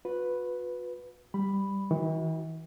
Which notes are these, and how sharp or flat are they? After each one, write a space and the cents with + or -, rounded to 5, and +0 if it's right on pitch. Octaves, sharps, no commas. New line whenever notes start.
F#4 -45 B4 +0
G3 +0 B5 +0
E3 -45 F#4 +5